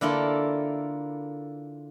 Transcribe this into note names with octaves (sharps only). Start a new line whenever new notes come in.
D3 A#3 E4 F4 A4